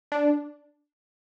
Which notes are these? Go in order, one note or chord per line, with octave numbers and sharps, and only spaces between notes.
D4